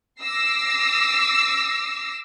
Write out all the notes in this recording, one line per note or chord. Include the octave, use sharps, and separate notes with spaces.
D6 E6 A#6 C7